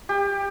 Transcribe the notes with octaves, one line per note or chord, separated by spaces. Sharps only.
G4